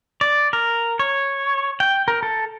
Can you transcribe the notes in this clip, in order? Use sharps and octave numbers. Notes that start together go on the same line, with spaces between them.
D5
A#4
C#5
G5
A#4
A4